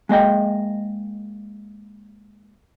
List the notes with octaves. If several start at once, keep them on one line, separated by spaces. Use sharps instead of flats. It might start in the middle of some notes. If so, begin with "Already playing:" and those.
G#3 A#3 D#5 G5